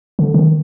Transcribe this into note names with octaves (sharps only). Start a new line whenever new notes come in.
D3
D#3